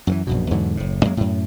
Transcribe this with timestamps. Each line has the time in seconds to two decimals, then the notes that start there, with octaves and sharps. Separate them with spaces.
0.07 F#2 D#3 E3
0.27 A#1 F#2 B2
0.50 E2 G#2 D3 F#3
0.77 F#1 A2
1.05 F#2 F#3 G#3 A#3
1.17 F#2 A2